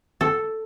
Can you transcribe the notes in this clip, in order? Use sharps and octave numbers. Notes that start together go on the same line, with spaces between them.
A4